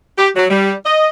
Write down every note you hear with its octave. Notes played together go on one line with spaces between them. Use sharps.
G4
F#3
G3
D#5